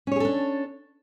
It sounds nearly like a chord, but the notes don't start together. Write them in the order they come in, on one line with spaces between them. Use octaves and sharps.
C#4 C#5 G#4 A4 D4